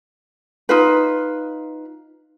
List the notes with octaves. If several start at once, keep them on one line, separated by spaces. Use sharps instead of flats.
D#4 F4 B4